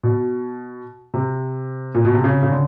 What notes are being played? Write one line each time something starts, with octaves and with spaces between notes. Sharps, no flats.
B2
C3
A#2
B2
C3
C#3
C#3
D3